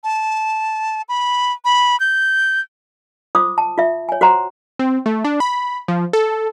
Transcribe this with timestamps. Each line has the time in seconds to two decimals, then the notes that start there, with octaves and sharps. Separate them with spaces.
0.04 A5
1.09 B5
1.65 B5
2.00 G6
3.35 F4 C5 D6 D#6
3.58 A5
3.78 F4 E5
4.09 C#5 G#5
4.21 F#4 C5 F#5 A#5 C6
4.79 C4
5.06 A3
5.25 D4
5.40 B5
5.88 F3
6.13 A4